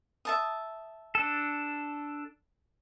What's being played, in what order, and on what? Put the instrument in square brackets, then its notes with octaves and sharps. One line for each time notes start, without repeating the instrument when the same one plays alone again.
[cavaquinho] E5 A5 D#6
[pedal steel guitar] D4 A4